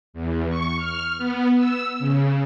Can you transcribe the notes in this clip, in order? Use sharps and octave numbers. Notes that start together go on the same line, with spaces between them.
E2
C#6
F6
B3
E6
C#3